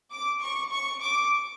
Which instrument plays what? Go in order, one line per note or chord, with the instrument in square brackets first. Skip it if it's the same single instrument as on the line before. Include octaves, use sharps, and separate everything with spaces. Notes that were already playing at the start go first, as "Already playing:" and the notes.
[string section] D6
C#6
C#6
D6